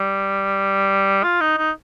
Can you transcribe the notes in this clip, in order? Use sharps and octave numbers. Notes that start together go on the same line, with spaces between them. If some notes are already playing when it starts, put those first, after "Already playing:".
Already playing: G3
F4
D#4
D#4